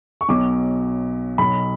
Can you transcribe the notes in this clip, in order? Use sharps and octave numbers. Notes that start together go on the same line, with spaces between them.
C#6
B1 B2 F#3 D6
B1 B2 F#3 B5